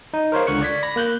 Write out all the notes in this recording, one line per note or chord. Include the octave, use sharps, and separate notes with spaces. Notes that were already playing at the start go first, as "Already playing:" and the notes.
D#4
A#4 C5 C#5 F5
C#2 D3 C#6 F#6 C#7
D5 G#6 B6
B5 A#6
A#3 F#6 G6